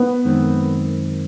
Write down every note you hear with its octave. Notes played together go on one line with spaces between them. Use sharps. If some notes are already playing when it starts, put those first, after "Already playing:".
Already playing: B3
F#2 D#3 G#3 C4